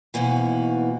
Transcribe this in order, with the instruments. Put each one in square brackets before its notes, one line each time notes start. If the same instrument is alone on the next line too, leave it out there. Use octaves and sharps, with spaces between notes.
[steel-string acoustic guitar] D#2 G#2 B2 E3